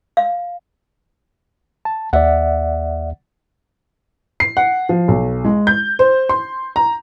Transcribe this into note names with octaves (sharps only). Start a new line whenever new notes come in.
F5
A5
D#2 D5 E5 F#5
C7
F#5
F3
B1
G#3
G6
C5
C6
A#5